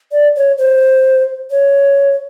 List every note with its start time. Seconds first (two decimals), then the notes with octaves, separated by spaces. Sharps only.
0.12 D5
0.36 C#5
0.58 C5
1.51 C#5